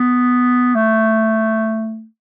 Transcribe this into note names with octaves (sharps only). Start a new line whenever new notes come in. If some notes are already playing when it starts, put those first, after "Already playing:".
Already playing: B3
A3